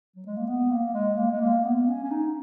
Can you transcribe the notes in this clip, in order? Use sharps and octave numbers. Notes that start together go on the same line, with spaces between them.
F#3
G#3
A#3
B3
A#3
G#3
A#3
G#3
A#3
B3
C#4
C#4
D#4